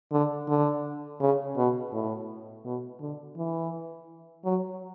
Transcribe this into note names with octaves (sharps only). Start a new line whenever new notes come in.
D3
D3
C#3
B2
A2
B2
D3
E3
F#3